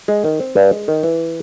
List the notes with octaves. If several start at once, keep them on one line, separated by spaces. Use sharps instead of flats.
G#3
D#3
C4
G2
G#3
D#3
E3